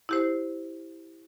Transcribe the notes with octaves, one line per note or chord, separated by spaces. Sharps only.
E4 G4 C5